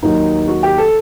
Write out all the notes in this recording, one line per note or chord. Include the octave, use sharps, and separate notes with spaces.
D#2 D#3 F#3 D#4
F#4
G4
A4